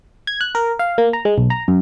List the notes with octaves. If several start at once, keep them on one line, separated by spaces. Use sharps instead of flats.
G#6
F#6
A#4
F5
A#3
A#5
G#3
B1
A#5
F#2